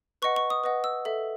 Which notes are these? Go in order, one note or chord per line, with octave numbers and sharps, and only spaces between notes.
B4 D#5 F#5 C#6
C#6
D#6
B4 D#5 F#5
E6
A4 E5